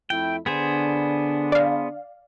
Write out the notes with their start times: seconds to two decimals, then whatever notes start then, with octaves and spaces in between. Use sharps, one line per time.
0.10 F2 A3 E4 G5
0.46 D3 B3 D4 G#4 C5
1.52 D5 F5